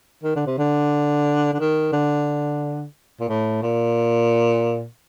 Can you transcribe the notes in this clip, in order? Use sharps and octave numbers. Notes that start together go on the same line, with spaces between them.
D#3
D3
C3
D3
D3
D#3
D3
A#2
A2
A#2